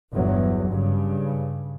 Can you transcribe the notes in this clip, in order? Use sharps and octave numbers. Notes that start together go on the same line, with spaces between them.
G1 E2 F#3
G2 C#3